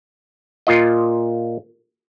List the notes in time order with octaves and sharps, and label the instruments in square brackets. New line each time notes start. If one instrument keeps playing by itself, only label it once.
[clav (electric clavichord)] A#2 F4 D#5